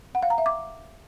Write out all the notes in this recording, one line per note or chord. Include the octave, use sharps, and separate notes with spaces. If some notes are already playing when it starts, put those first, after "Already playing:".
F#5
F5
A#5
E5
D6